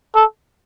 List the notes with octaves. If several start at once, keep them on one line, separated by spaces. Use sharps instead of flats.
A4